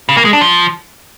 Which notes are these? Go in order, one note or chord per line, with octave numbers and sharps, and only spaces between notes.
C#3
A#3
G#3
D4
F3